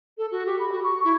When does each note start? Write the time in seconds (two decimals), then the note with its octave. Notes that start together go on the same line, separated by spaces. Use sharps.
0.18 A4
0.31 F#4
0.46 G4
0.59 B5
0.72 F#4
0.84 C#6
1.05 E4